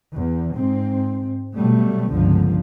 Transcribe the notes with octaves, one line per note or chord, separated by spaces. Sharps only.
E2
G#2 C4
B2 F#3 G3 A3
G1 C#2 D3 F3